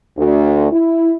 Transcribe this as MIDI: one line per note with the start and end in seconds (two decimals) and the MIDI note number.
0.18 0.68 38
0.72 1.15 64